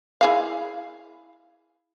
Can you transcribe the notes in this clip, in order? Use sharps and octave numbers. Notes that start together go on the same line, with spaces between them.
E4 G#4 F5